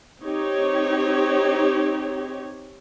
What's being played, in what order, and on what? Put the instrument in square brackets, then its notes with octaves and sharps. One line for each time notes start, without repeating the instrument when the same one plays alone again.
[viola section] C4 D#4 G4 C#5